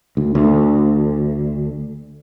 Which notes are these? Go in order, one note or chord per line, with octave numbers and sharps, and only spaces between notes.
D2
D2